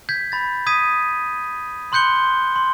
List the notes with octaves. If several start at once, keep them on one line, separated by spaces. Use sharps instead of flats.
G6 G#6 B6
B5 A6
D#6 G#6 B6 D#7
B5 C6 F#6 G6 C#7 G7
C6